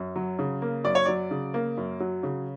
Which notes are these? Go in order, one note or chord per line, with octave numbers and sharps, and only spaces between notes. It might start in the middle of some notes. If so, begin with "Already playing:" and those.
Already playing: F#2
F#3
C#3
A#3
F#2 D5
C#5
F#3 D5
C#3
A#3
F#2
F#3
C#3